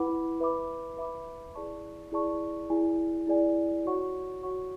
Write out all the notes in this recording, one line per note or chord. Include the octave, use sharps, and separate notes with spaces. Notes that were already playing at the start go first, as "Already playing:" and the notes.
Already playing: E4 B4 F#5 B5 D6
B4 E5 B5 D6
B4 E5 B5 D6
E4 G#4 D5 A5 C#6
E4 G#4 D5 A5 C#6
E4 G#4 D5 G#5
E4 G#4 D5 G#5
F#4 C#5 F#5 C#6
F#4 C#5 F#5 C#6